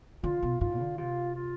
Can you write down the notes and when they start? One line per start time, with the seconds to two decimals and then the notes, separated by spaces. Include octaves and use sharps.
0.23 D3 F4
0.43 B2
0.61 G#2 F4
0.79 D3
0.98 C3 F4
1.35 F4